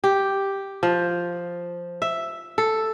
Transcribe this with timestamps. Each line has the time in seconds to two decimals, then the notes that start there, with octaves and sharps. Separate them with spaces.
0.04 G4
0.83 F3
2.02 E5
2.58 A4